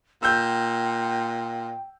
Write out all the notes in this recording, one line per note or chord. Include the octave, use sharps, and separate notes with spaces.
A#2 G5 E6 G6